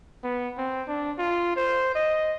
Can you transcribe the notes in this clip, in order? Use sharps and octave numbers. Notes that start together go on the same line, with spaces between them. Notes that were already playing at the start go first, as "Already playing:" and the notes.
B3
C4
D4
F4
C5
D#5